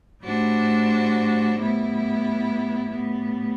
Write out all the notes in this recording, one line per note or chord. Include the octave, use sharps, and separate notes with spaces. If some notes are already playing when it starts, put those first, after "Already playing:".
A2 G3 D4 F#4 C5
A2 G3 B3 E4
A2 G3 B3